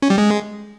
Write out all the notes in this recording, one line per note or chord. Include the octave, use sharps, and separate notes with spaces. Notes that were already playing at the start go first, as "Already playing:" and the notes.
C#4
G3
G#3